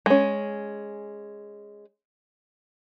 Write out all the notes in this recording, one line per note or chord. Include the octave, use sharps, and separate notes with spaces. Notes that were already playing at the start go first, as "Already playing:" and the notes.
G#3 C#4